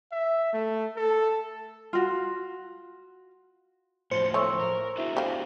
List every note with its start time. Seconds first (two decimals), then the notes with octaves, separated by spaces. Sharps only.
0.12 E5
0.53 A3
0.97 A4
1.93 F4 F#4
4.11 A2 F3 F#3 C5 C#7 G7
4.34 A3 C#5 C6 C#6 E6
4.60 A#4
4.97 D4 E4 F#4 G#4 E5
5.17 G4 F5